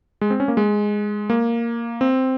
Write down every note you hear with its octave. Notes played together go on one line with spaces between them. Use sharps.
G#3
C4
C#4
A#3
G#3
A#3
C4